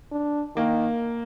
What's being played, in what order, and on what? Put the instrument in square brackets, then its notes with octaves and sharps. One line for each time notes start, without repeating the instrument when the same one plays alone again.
[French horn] D4
[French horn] D#3 [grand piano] A#3